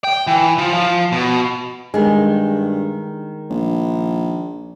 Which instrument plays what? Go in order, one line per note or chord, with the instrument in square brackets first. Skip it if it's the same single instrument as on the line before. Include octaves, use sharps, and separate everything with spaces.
[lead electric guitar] G5
E3
F3
F3
B2
[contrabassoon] G2 [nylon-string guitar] D#3 G#3
[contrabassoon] A#1